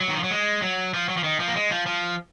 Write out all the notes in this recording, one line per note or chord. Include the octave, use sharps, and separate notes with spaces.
F#3
D#3
F3
F#3
G#3
F#3
F3
F#3
F3
D#3
F3
A#3
G#3
F3
F3